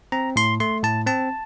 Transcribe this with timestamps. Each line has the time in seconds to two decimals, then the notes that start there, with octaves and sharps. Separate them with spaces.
0.12 C4 A#5
0.36 A2 C6
0.60 A3 C6
0.83 A2 A5
1.07 C4 A5